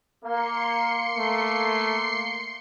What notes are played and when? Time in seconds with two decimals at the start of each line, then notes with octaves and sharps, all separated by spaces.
0.24 A#3 C6 C7 C#7
1.17 A3 A#3